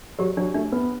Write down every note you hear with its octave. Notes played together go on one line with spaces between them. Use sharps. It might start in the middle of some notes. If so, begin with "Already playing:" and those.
F#3 G4
F#3 D4
A3 D4
B3 B4